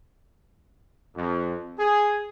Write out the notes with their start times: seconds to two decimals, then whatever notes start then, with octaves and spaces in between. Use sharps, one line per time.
1.16 F2
1.78 G#4